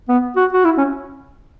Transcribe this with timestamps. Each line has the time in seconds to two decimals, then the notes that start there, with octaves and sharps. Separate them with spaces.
0.09 B3
0.36 F#4
0.53 F#4
0.65 E4
0.78 C#4